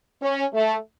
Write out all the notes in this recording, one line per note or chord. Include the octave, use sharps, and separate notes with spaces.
C#4
A3